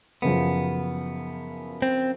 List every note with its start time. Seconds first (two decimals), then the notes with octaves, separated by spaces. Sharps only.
0.22 F#2 C#3 F3 B3
1.82 C4